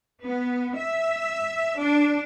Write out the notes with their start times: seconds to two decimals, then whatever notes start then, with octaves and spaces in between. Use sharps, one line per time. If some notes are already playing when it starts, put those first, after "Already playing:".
0.23 B3
0.76 E5
1.78 D4